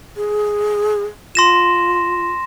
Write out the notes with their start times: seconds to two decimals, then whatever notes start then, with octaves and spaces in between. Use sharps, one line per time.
0.16 G#4
1.35 F4 C6 A#6 E7